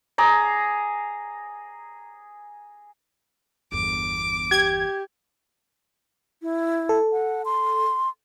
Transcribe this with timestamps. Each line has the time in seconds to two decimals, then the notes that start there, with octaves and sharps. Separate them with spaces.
0.18 G#4 A#5 D6
3.72 G1 E2 D6
4.51 G4 G#6
6.42 E4
6.89 A4
7.12 F#5
7.45 C6